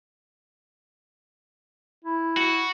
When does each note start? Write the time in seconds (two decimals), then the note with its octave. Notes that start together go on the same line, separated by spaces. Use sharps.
2.04 E4
2.37 F#4